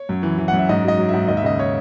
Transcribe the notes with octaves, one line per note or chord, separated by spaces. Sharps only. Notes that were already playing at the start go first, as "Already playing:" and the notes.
Already playing: C#5
F#2
E3
E3
F#2 F#5
E5
G#2 D#5
F#3 D#5
F#3
G#2 E5
D#2 D#5
E5
C#3 D#5
C#5